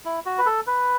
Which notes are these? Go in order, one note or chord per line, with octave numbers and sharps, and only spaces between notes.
E4
F#4
B4
A4
B4